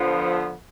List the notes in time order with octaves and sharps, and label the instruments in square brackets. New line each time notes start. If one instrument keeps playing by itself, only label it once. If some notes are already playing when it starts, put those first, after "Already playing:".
Already playing: [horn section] D3 F3 B3